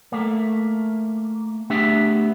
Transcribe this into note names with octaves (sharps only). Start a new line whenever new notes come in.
A3 A#3
A3 B3 D4 G4 G#4 E5